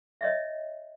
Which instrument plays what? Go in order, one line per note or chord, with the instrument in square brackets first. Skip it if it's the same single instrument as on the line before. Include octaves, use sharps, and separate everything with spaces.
[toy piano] C#5 D#5 E5